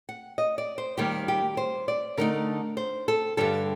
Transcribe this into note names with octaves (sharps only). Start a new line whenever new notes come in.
F#5
D#5
D5
C5
D#2 D#3 G3 A#3 G4
G4
C5
D5
D3 A3 D#4 A#4
C5
A4
G2 D3 G3 A4